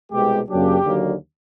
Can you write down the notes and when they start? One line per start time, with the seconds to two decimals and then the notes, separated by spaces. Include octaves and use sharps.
0.12 C2 B2 G#3 G4
0.48 F#2 C#3 F#3 A#3 D4 G4
0.84 D#2 D3 F#3 A#3